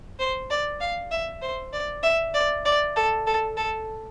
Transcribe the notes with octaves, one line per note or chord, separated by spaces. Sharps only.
C5
D5
F5
E5
C5
D5
E5
D5
D5
A4
A4
A4